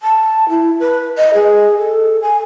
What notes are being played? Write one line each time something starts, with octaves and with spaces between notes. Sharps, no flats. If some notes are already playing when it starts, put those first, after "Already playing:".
A5
E4
B4
D#5
G#4
A4
G#5